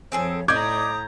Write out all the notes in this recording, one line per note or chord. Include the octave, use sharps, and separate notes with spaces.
F2 C4 G#4 A4 C#5
A2 D#4 D5 A#5 D6 D#6 G6 G#6